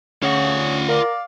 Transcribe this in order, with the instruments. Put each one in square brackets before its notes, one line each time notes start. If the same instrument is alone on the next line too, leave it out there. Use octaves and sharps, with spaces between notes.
[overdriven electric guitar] D2 [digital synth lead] C#4 [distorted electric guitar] F4 F#5 [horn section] G#4 C#5
[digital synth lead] A#4 [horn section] D5 F5